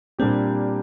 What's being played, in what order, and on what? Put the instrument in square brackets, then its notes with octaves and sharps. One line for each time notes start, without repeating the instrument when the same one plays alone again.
[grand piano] A#2 G3 A#3 D4 G4 [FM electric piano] C4